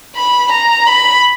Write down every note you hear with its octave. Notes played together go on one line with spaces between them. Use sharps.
B5
A#5
B5